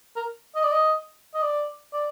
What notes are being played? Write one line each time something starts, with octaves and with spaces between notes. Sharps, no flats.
A#4
D#5
D5
D#5
D#5
D5
D5